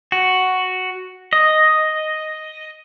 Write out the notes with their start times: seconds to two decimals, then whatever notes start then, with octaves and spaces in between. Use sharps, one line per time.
0.12 F#4
1.33 D#5